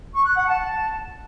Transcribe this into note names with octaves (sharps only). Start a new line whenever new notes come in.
C#6
F#6
F#5
A5